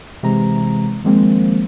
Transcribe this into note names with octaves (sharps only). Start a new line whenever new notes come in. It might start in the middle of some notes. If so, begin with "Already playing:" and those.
C3 E3 G#3 A#5
D#3 F3 G#3 A#3 C4